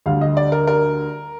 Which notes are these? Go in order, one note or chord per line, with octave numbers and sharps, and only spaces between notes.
D2 D3 G3 F5
D#5
D5
A#4
A#4